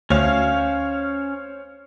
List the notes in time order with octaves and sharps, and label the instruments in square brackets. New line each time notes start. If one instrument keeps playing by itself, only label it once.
[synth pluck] D2 [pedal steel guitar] C#4 F5 [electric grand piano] C5 C#5